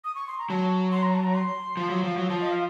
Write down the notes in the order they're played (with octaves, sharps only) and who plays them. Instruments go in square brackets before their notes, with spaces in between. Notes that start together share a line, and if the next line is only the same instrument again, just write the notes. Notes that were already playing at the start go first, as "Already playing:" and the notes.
[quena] D#6
C#6
C6
A#5
[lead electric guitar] F#3 [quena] A5
[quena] C6
A#5
A5
A#5
C6
[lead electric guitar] F3
F#3
F3
F#3
[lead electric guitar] F3 [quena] A5
[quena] D#5
F5